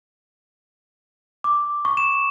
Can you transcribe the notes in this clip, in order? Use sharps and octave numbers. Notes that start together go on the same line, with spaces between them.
D6
C#6
E7